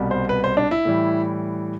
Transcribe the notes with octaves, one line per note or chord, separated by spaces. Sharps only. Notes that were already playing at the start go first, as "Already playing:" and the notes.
Already playing: C2 B2 G3
C5
B4
C5
D4
E4
A2 E3 G3